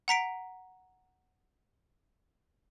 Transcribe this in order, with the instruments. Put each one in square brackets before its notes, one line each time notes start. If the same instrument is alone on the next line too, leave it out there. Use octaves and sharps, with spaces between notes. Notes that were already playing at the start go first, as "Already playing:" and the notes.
[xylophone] F#5 A#5 B6 D7